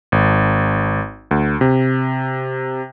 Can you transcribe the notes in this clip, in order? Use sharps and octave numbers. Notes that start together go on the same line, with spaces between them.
G#1
D2
C3